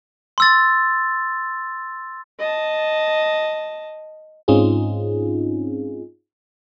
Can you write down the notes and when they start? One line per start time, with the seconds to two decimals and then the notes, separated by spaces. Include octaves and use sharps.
0.38 C6 E6 A6
2.39 D#5 A5
4.48 G#2 C4 C#4 D#4 F4 G#4